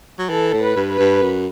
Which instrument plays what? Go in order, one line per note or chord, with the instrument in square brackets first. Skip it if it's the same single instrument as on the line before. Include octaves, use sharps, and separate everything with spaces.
[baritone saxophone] F#3
[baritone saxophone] E3 [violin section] A4
[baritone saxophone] A2
[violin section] B4
[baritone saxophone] G2
[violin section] B4
[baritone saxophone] G2
F#2